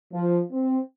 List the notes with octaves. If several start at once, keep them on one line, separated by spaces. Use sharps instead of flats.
F3
C4